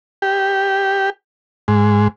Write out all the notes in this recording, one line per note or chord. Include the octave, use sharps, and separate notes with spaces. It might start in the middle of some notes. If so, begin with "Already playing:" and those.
G4
G#2